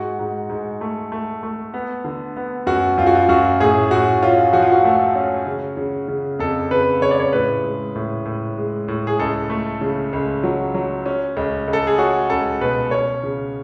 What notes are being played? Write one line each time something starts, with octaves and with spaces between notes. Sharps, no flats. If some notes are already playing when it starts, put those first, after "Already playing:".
Already playing: G#2 F#4
G#2
G#2
A3
A3
A3
B3
D3
B3
F#2 F#4
F#2 F4
F#4
F4
F#2 F#4
A2 G#4
A2 F#4
C#4 F4
F3 F#4
F4
F#4
A3
C#4
C#3
C#3
C#3
F2 A4
C#3 B4
C#3 C#5
D5
C#5
A2 B4
G#3
A2
A2
G#3
A2
G#4
C#2 A4
A3
C#3
C#2
F#3
F#3
C#4
C#2
C#2
A4
G#4
C#4 F#4
C#2 A4
B2 B4
C#4 C#5
C#3